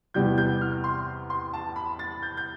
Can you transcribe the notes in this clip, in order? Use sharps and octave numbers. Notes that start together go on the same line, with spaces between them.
E2 C3 E3 G3 B3 G6
G6
F6
C6
C6
A5
B5
A6
G6
G6